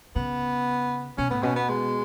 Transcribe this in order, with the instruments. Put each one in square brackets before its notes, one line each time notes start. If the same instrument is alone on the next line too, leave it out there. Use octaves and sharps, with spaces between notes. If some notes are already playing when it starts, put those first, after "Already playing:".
[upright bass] C#3 [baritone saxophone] B3
[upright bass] B2 [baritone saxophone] C#4
[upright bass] A2 [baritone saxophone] B3
[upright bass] B2 [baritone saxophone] C#4
[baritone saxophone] B3
G#3